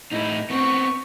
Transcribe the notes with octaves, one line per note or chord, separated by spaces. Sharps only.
A2 D#4 E4
B3 C4 C#6